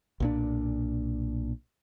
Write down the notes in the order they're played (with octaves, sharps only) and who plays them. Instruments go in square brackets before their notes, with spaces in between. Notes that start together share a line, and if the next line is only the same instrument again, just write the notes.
[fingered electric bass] B1 A#2 D4